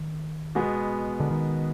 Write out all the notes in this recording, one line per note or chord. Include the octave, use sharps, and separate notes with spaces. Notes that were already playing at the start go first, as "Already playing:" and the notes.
Already playing: D#3
B2 G#3 B3
D3
D#3